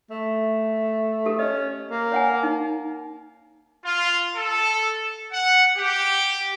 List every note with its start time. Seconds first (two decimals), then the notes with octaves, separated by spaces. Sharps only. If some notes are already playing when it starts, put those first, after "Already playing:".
0.10 A3
1.26 G4 A4
1.39 C#4 D#5
1.91 A#3
2.12 C#5 F#5 G#5
2.43 D#4
3.84 F4
4.35 A4
5.32 F#5
5.77 G4